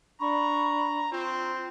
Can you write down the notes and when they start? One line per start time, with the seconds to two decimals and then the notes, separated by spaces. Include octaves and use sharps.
0.21 D4 A#5 B5 C#6
1.12 C4 F4